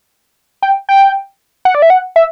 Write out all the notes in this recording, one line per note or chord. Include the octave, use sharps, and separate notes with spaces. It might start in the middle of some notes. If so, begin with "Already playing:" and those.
G5
G5
F#5
D5
E5
F#5
E5